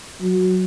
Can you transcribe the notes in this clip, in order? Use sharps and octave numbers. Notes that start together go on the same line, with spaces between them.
F#3